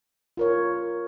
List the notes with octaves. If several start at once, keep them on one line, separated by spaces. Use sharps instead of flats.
F4 A#4 C#5